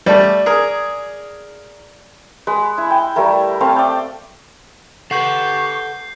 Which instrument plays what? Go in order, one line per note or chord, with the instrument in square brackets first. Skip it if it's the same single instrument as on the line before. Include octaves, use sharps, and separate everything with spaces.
[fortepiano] G3 A3 [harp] D5
[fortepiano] G#4 A#4
[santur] G#3 B4
E4
G5
G3 A3 E4 A#4
A3 C4 F5 A5
D5 E5 G5
[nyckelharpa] G4 B4 [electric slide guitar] A4 F#5 [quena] C#6 [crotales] G6 C7